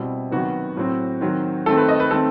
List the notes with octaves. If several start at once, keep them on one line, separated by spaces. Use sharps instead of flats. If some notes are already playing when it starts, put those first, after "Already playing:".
Already playing: B2 G3 C4 E4
C3 D#3 F#3 B3 F#4
A2 F#3 C4
D#3 F#3 C4
D#3 A3 C4 A4
B4
D#5
B4
D#3 A3 C4 A4